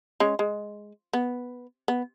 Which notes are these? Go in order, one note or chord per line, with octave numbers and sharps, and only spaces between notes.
G#3 C#4
G#3
B3
B3